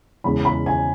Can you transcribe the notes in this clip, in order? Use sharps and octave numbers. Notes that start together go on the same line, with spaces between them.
E2 C#3 G#3 C#4 B5
B5
G#5